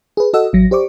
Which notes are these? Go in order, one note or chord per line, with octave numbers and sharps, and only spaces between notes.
G#4 B4
F#4 A4 D#5 F#5 E6
A1 F#3 A#6
G4 C5 D5 C#6 D6